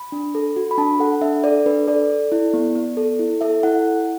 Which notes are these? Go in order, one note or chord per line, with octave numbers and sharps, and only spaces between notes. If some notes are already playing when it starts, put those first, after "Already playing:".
Already playing: B5
D4
A4
F#4
B5
D4 A5
A4 F#5
D4 E5
A4 D5
D4 B4
A4 D5
A4
E4
B3
B3
A4
E4
A4 E5
E4 F#5